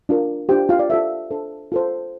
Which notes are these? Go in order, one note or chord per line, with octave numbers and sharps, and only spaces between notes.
D4 F4 A#4
D4 F4 G4 C5 G5
F4 F5
D5
F4 A4 C5 E5
D4 A4 C5
F4 A4 C5